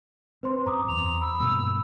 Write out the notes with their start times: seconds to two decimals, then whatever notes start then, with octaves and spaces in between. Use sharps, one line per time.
0.43 C4 B4 C5 C6
0.66 F#2 A#5 D6 D#6
0.88 E2 F7
1.21 B5 E6
1.40 G2 B2 A#3